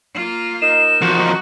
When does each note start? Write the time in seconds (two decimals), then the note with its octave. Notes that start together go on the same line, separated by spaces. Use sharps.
0.14 A#3 F4
0.62 D#4 A#4 D#5 E7
1.01 E2 F3 F#4